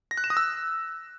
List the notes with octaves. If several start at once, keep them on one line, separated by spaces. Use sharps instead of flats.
A#6
F#6
E7
D#6
E6